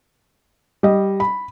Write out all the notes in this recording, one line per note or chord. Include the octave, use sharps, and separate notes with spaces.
G3 D#5
B5